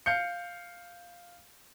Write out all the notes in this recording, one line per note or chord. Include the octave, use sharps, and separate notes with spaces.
F5 G6 C#7